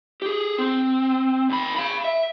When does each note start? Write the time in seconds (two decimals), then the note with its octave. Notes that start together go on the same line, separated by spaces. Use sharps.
0.22 G4 G#4
0.58 C4
1.50 D#2 B5
1.76 F5 B5
2.04 E5